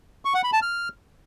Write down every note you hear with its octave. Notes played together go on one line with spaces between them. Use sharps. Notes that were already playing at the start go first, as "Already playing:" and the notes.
C#6
F#5
B5
A5
F6